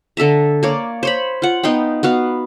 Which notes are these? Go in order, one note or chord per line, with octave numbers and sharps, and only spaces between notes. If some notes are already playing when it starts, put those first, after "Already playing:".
D3 A4 E5 A#5
A#3 C#5 D5
C5 C#5 B5
F4 F#5
B3 D#4 F5 G5
B3 F#4 F5